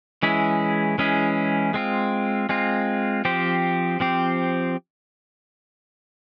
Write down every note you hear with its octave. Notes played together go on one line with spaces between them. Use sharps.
E3 G#3 C#4 E4 G#4
E3 G#3 C#4 E4 G#4
G#3 C4 F4
G#3 C4 F4
F3 C4 G4 C5
F3 C4 G4 C5